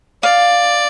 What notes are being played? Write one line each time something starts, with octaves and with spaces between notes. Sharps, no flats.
D5 F5